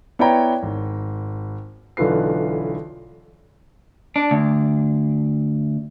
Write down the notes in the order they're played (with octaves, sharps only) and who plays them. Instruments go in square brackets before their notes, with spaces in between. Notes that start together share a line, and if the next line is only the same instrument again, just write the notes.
[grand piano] B3 E4 C#5 D5 G5 A#5
G#1
B1 D3 E3 F4 B4 C7
[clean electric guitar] D4
D2